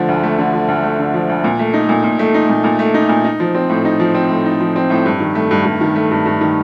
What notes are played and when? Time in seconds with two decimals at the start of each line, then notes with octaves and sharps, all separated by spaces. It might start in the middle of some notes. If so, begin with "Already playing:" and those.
Already playing: D3 F3 A3
0.09 D2
0.24 A3
0.39 D3
0.53 F3
0.68 D2
0.83 A3
0.99 D3
1.14 F3
1.29 D2
1.44 A#2
1.59 A3
1.74 D#4
1.89 A#2
2.04 A#2
2.19 A3
2.34 D#4
2.50 A#2
2.64 A#2
2.79 A3
2.94 D#4
3.09 A#2
3.24 D#4
3.40 F3
3.55 C4
3.69 A2
3.85 D#4
4.00 F3
4.15 C4
4.30 A2
4.46 D#4
4.60 F3
4.76 C4
4.90 A2
5.06 G2
5.20 D#3
5.35 A3
5.51 G2
5.65 G2
5.81 D#3
5.96 A3
6.11 G2
6.26 G2
6.41 D#3